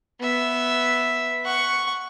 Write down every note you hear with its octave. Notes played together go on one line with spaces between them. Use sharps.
B3 E5
F#5 C#6